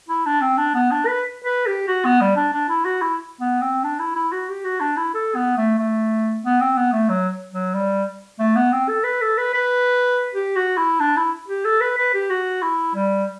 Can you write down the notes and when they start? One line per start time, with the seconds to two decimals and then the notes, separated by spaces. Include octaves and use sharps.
0.09 E4
0.26 D4
0.41 C4
0.58 D4
0.75 B3
0.91 D4
1.07 B4
1.45 B4
1.67 G4
1.88 F#4
2.05 B3
2.21 G3
2.36 D4
2.53 D4
2.69 E4
2.85 F#4
3.02 E4
3.40 B3
3.61 C4
3.84 D4
3.99 E4
4.16 E4
4.32 F#4
4.49 G4
4.64 F#4
4.81 D4
4.97 E4
5.14 A4
5.35 B3
5.58 A3
5.78 A3
6.45 B3
6.61 C4
6.77 B3
6.93 A3
7.09 F#3
7.53 F#3
7.74 G3
8.39 A3
8.56 B3
8.72 C4
8.88 A4
9.04 B4
9.21 A4
9.37 B4
9.54 B4
10.35 G4
10.56 F#4
10.78 E4
11.00 D4
11.17 E4
11.48 G4
11.65 A4
11.81 B4
11.98 B4
12.14 G4
12.30 F#4
12.63 E4
12.95 G3